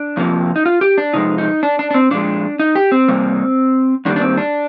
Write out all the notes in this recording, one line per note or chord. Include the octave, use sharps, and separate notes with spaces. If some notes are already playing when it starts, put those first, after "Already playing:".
Already playing: D4
F2 C3 F3 A#3
D#4
F4
G4
D4
C3 F3 G#3 D#4
D#4
D4
D4
D4
C4
A#2 F3 G#3 D4
D#4
G4
C4
C3 G3 A#3
G2 D#3 G3 A#3 D4
D4
C4
D4